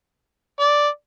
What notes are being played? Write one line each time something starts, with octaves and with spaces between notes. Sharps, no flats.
D5